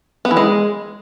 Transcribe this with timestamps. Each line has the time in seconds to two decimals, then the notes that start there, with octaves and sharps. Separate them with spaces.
0.25 B3
0.31 E3
0.37 G#3